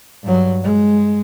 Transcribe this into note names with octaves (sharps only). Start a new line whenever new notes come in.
G2 F#3
G#3